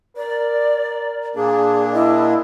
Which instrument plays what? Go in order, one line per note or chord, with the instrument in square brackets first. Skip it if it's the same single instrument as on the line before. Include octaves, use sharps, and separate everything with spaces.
[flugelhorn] A#4 [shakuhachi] D5
[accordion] A#2 A#3 D4 [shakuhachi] G#4
[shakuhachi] E4 [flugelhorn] D#5